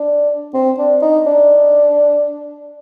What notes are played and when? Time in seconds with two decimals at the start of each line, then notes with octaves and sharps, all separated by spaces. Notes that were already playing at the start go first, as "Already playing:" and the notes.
Already playing: D4
0.54 C4
0.78 D4
1.02 D#4
1.26 D4